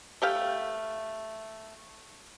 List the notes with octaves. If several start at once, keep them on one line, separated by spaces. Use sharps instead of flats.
A3 G4 F5